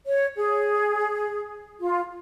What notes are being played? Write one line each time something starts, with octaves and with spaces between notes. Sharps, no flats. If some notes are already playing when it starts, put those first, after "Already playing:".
C#5
G#4
F4